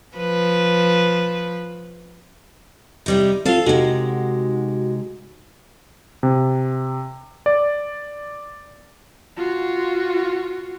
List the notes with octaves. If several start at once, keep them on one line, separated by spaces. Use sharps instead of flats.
F3 B4
C3 G3 D#4
C4 F4 A4 F5
C3 G#3 D#4 F#4
C3
D5
F4 F#4